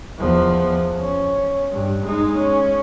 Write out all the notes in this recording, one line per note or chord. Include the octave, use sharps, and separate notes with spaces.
E2 F3
C#4
G2
G#3 D#4
C#4